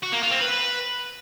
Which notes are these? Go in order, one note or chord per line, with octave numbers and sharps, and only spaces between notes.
F#4
A#3
F4
C4
B4